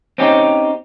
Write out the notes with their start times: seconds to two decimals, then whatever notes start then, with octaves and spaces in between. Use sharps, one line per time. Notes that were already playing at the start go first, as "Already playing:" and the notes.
0.18 C4 C#4 D#4 G4